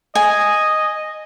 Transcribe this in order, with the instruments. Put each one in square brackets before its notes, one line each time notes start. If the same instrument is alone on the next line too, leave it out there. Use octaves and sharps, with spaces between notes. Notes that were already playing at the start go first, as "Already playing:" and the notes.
[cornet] D#5 [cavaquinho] G#5